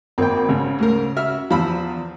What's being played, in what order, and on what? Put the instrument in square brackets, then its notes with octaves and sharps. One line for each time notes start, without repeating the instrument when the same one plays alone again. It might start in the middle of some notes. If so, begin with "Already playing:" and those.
[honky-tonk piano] G#1 A#3 [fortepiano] C4 G5
[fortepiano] G#1 [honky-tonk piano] C#3
[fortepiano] D2 G#2 A#4
F#4 E5 F6
[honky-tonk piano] E2 [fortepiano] F3 B5 E6